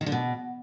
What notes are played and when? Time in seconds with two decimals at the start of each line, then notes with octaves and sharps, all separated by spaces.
0.01 D#3
0.06 D3
0.12 B2